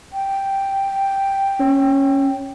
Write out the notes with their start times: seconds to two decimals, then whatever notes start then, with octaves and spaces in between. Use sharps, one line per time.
0.13 G5
1.60 C#4